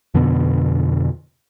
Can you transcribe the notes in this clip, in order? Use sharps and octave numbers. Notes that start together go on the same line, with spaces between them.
F2 B2 D3 B3